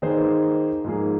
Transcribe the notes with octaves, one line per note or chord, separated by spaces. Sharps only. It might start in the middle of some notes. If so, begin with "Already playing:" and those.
D#3 A#3 D#4 G#4 C5
G#2 F3 A#3 G#4